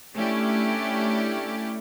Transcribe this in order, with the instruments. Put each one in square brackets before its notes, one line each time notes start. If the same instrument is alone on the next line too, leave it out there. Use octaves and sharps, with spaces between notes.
[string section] A3 C#4 D4 E4 G4 D5